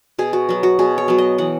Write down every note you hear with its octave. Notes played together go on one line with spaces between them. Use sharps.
B2 G#4
F#4
F#3 B3
F#4
B2 G#4
C#5
F#3 B3
D#5
E3 F#5